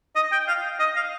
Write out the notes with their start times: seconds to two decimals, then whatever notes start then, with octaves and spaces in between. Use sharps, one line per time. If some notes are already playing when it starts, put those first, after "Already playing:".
0.16 D#5
0.32 G5
0.48 F5
0.79 D#5
0.96 F5